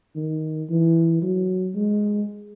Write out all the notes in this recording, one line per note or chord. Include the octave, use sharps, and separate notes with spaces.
D#3
E3
F#3
G#3